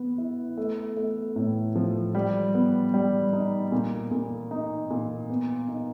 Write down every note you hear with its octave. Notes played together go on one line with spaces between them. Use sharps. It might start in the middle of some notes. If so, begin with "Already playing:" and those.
Already playing: B3
E4
A3
A3
A2
F3
G3
B3
G3
D#4
A#2
A#2
D#4
A#2
B3
D#4